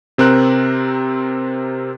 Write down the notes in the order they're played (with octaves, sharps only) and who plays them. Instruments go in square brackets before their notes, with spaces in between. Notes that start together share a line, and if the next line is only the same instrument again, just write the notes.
[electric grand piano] C3 C4 A#4 F#6